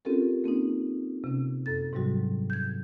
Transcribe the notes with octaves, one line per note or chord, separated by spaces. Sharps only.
C4 C#4 F4 G4 A4 A#4
A#3 C4 C#4 D#4
C3 C#4
F#2 A4 A6
G#2 C3 F#3 G3 F#4
G6 G#6